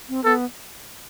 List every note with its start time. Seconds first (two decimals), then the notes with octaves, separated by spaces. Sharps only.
0.09 C4
0.24 B3 A4